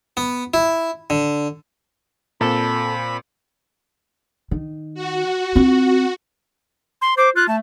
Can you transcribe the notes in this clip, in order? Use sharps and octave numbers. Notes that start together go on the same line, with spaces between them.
B3
E4
D3
A#2 C4 A4 B5
D#3
F#4
C4 F4
C6
C5 D6
F4 F#6
A3 A5